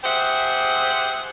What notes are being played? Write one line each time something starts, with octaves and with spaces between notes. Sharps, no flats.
G4 G#4 C5 E5 F#5